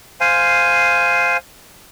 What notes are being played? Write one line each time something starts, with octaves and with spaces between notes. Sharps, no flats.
C5 F5 G#5